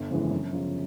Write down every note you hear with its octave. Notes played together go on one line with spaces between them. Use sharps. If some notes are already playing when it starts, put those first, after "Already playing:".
Already playing: G1
F2 C#3 E3 G#3
F#2
C#3 F3